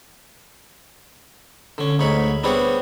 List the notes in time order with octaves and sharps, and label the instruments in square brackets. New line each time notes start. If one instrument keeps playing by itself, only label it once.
[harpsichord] D3 C#4
D2 G#2 C#5 B5
G3 B3 C4 D4 G#4 C#5